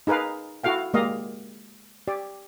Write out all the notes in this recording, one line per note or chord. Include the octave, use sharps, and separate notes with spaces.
D#4 G#4 A#4 B4 F5
E4 F#4 A4 F5 G5
G#3 A#3 G4 D5 D#5 F5
G4 D5